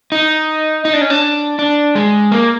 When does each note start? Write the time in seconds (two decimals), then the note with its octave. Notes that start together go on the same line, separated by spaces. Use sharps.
0.12 D#4
0.85 D#4
0.93 D4
1.01 C#4
1.10 D4
1.59 D4
1.95 G#3
2.32 A#3